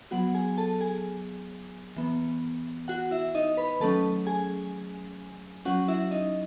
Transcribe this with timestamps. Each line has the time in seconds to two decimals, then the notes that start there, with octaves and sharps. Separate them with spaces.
0.11 F#3 B3 F#4 F#5
0.34 G#4 G#5
0.58 A4 A5
0.81 G#4 G#5
1.96 E3 B3
2.88 F#4 F#5
3.11 E4 E5
3.35 D#4 D#5
3.57 B4 B5
3.80 D#3 F#3 A3 C#4 A4 A5
4.27 G#4 G#5
5.65 F#3 C#4 F#4 F#5
5.88 E4 E5
6.11 D#4 D#5